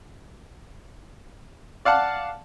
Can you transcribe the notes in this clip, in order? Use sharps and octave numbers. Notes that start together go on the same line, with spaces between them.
D5 F5 F#5 A5